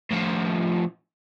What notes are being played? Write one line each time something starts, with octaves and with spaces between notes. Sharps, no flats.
A2 F3